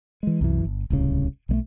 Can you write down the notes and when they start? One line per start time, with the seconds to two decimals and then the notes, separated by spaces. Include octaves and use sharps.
0.23 E3 G#3
0.41 C2 F#2 E3
0.65 G1
0.90 D1 C2 C#3
1.49 B1 G#3 A3